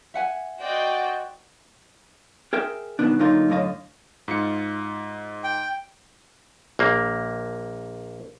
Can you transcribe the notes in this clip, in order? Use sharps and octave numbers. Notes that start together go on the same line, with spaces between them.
E5 F#5 G#5
F#4 C5 D5 D#5 G5
G#4 A#4 E5 G5
C2 G2 B2 D#3 B3 D4
D3 F#3 A#3 D#4 F4
F#2 A2 D3 D#5 F5
G#2 F4 C#7
G5
A#1 A#3